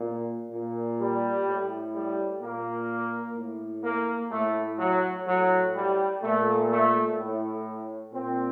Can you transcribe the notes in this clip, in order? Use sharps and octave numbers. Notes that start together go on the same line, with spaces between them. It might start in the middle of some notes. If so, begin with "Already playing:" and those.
Already playing: A#2
A#2
G3
A2
G3
A#2 A#3
A2
A#3
A2 A3
F#3
A2 F#3
G3
A#2 A3
A3
A2
A#2 C4